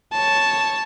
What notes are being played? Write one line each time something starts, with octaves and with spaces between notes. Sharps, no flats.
C#5 A5